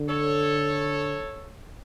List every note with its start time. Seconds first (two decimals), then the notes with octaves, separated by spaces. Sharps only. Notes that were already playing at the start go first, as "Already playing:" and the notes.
Already playing: D3
0.08 A4 C#5